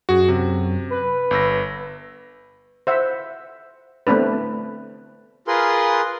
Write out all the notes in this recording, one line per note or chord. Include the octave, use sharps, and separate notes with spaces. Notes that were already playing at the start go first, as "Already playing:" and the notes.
F#2 F#4 G#4
C3
B4
G1 E6 A#6
C5 E5 F#5
A3 B3 C4 D4 B4
F4 G#4 A#4 B4 C6